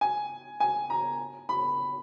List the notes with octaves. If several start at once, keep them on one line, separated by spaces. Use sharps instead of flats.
G#5
G#5
A#5
B5